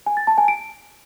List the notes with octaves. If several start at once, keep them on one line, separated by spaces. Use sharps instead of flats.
G#5
A6
A5
G#5
D7